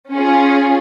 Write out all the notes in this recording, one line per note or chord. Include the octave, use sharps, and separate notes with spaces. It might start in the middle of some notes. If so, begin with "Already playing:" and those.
C#4 F4 G#4